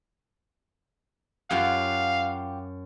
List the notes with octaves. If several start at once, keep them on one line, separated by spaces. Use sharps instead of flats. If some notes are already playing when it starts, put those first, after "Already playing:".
F#2 F4 G4 F5 F#5